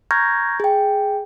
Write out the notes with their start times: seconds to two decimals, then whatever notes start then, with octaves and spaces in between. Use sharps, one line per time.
0.11 A#5 C#6 F6 G6 G#6 A#6
0.60 G#4 G5